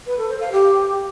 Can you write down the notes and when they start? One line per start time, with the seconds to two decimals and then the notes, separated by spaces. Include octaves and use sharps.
0.06 B4
0.17 A4
0.29 C5
0.40 F5
0.52 G4